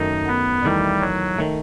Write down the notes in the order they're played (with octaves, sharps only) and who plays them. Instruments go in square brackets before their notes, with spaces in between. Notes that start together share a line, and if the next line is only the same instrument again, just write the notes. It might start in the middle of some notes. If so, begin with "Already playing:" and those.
Already playing: [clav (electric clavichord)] F#2 D#3 A3 [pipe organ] D#4
[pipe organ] B3
[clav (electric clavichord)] E2 D#3 A3 E4 [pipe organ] G3
[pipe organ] F#3
[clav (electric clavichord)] D#3 A3